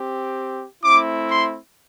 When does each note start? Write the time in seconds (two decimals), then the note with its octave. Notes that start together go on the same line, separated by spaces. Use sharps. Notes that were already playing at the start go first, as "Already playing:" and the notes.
Already playing: C4 G4
0.84 A3 C4 E4 D6
1.29 C6